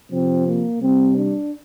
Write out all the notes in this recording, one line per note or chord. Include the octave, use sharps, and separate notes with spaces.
C3 F3 C4
A#3
C3 G3 C4
D4